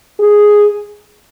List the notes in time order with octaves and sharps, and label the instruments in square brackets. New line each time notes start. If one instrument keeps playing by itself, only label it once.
[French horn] G#4